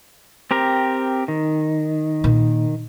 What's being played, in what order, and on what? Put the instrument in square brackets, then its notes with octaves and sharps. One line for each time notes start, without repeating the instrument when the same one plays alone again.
[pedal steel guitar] C4 G4 A#4
D#3
[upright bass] A#2